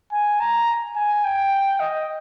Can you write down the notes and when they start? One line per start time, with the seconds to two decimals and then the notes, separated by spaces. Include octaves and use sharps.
0.12 G#5
0.40 A#5
0.96 G#5
1.25 G5
1.80 D#5